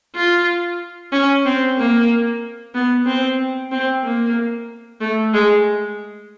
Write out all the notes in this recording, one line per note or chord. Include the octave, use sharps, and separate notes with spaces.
F4
C#4
C4
A#3
B3
C4
C4
A#3
A3
G#3